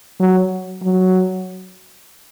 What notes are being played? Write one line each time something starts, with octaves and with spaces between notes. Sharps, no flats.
F#3
F#3